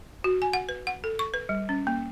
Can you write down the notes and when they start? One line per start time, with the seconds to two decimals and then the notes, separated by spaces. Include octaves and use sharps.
0.24 F#4
0.42 G#5
0.53 F#5
0.69 B4
0.87 F#5
1.04 A4
1.19 C#6
1.34 B4
1.49 G3
1.69 C#4
1.87 A#3